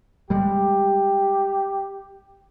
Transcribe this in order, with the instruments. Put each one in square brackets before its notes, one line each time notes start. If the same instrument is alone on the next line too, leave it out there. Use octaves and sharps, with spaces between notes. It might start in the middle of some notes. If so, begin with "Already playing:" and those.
[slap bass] G3 G#3 [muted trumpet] G4